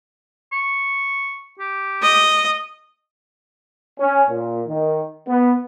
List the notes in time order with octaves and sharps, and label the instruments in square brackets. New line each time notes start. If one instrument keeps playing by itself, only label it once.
[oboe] C#6
G4
[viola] D#5
[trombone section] C#4
A#2
D#3
B3